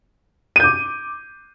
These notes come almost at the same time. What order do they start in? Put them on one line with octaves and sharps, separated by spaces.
D#7 G6 D6